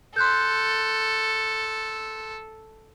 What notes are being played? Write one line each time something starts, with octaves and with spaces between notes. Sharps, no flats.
A4 C6 F#6 G6